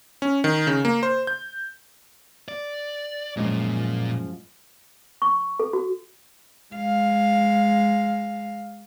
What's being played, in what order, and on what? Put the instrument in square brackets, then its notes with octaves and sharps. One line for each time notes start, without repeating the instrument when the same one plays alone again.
[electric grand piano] C#4
D#3
C#3
A#3
C5
G6
[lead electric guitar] D5
[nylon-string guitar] F#2 F3 G#3 [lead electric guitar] A#2
[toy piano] C#6
A4
F#4
[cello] G#3 F5